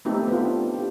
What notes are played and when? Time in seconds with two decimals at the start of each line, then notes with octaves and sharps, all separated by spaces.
0.05 A3 B3 C4 D#4 G4 A4
0.28 B3 F4
0.45 D4
0.74 G4